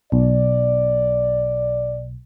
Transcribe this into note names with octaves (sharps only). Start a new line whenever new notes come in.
B1 D5